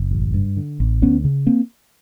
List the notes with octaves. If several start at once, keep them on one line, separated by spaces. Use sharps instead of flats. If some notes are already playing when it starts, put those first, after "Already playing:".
Already playing: F#1
A1
G2
D3
A1
D2 B3 C#4
C#3
A#3 C4